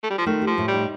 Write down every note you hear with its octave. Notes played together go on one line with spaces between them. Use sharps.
A3
G3
F3
D#3 A3
G4
F3
A2
G3
D#4